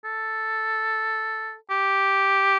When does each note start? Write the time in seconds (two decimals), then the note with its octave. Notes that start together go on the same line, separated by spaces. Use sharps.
0.05 A4
1.71 G4